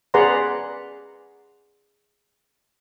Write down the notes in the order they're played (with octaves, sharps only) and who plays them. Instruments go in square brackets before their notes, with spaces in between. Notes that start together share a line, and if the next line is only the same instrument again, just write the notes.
[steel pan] G#4 B4 D5 F#5 A#5 C6